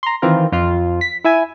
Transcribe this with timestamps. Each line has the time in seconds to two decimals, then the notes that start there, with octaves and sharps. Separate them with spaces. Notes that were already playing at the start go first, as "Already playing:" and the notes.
0.03 A#5 C6
0.22 D#3 E3 C4 F4 A#4
0.52 F2 F4
1.01 B6
1.24 E4 E5 G#5